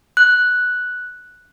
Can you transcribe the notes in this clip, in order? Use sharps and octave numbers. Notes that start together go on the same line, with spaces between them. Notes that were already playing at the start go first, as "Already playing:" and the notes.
F#6